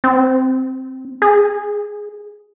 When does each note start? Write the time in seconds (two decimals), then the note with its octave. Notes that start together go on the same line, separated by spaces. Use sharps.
0.04 C4
1.22 G#4